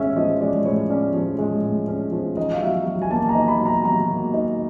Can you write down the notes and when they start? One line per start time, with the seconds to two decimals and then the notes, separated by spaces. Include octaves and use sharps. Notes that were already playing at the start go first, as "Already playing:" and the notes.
Already playing: A2 G#3 C#4 E5
0.16 F3 D#5
0.41 G#3 D5
0.65 A2 C#5
0.90 C#4 D5
1.14 F3
1.39 G#3
1.63 A2
1.88 C#4
2.12 F3
2.37 D#4 D#5
2.53 F5
2.61 F#3 E5
2.86 F#3
3.02 G#5
3.10 A#3 A5
3.29 A#5
3.35 D#4
3.48 B5
3.59 F#3
3.66 A#5
3.85 F#3 A#5
4.10 A#3
4.34 D#4